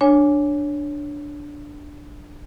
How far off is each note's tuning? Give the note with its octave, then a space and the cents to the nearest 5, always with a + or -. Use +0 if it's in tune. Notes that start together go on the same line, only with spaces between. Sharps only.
D4 +0 C#5 +0 G#5 +0